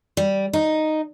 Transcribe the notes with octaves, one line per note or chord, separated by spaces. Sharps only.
G3
D#4